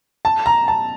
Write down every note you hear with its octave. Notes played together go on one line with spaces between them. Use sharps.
A5
A#5
A5